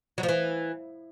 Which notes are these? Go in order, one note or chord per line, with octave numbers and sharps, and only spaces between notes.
F#3
F3
E3